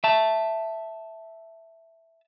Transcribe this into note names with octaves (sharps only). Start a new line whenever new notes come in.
E5 A5